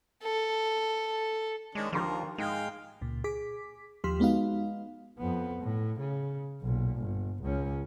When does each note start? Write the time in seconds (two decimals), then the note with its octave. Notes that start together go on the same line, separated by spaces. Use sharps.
0.23 A4
1.75 D#3 G#3 C#4 D4
1.93 D#2 D3 F3 A#4 C6
2.38 G#2 G#3 F5 G5
3.01 C#2 A#2
3.24 G#4 D6 B6
4.04 D#2 F3 G4 C6 F6 B6
4.20 G#3 B3 D#4 F#4 F5
5.19 F2 B3
5.61 A2
6.00 C#3
6.62 B1 A#2
6.97 G1
7.43 C#2 C#4